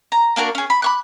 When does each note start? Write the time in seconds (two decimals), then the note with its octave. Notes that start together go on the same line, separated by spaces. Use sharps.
0.12 A#5
0.36 A#3 D4 F#4 A#4
0.55 C#4 G#4
0.70 B5
0.82 B5 C#6 F#6